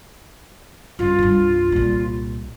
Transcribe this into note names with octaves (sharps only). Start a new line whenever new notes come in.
G2 C#3 F4
C2 G2
C2 A#2